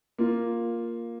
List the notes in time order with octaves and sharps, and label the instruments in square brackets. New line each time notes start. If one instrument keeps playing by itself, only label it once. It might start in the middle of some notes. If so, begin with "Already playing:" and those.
[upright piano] A#3 F4